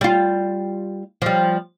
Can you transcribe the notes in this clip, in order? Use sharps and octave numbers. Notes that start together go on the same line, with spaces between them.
G3 F4
F3 G3